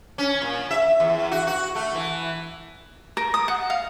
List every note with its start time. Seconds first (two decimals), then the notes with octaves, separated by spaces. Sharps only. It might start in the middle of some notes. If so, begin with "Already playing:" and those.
0.18 C#4
0.42 A#2
0.71 E5
1.00 E2
1.31 F#4
1.47 F#4
1.75 A3
1.95 E3
3.17 A#4
3.34 D#6
3.48 F#5
3.70 F5